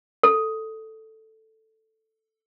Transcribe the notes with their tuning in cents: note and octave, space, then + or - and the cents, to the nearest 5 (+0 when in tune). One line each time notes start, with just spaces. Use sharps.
A4 +5